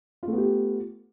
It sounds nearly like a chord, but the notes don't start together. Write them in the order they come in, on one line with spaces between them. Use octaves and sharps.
F4 A3 B3 G4